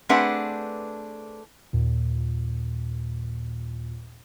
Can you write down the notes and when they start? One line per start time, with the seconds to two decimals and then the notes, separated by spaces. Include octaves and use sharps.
0.09 A3 C4 D4 G#4 B4 F#5
1.73 D#2 A#2